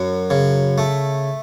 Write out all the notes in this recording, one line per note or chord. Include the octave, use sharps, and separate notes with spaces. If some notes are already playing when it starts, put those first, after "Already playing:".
Already playing: F#2
C#3
A3